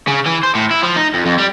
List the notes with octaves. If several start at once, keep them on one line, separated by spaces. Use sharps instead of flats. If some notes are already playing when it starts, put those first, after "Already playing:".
C#3
E3
C5
A2
E4
F3
D#4
F2
F2
G3